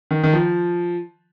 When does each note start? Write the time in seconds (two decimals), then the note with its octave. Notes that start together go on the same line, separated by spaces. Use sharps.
0.11 D#3
0.23 D#3
0.33 F3